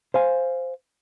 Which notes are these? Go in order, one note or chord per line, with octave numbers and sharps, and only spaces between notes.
C5 F5 G#5